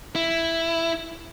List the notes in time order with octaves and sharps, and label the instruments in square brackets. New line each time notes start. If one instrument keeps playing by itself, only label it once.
[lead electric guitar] E4